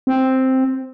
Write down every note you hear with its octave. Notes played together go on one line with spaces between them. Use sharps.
C4